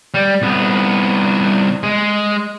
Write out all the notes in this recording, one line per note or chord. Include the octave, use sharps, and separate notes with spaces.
G3
C2 B3
G#3